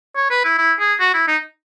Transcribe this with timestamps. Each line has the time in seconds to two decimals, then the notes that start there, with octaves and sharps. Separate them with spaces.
0.16 C#5
0.31 B4
0.44 E4
0.58 E4
0.79 G#4
1.00 F#4
1.14 E4
1.28 D#4